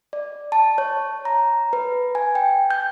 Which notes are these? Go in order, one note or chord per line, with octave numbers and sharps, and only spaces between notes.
D5
A5
C#5
A#5
B4
G#5
G5
G6